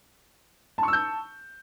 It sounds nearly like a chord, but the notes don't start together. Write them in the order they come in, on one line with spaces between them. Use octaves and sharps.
A5 C#6 E6 G6